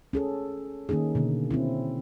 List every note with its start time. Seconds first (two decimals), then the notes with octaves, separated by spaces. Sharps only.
0.13 C#4 G#4 A4
0.89 D#3 A#3 C#4 D#4 G#4
1.15 B2 D3 A#3
1.51 C4 C#4 E4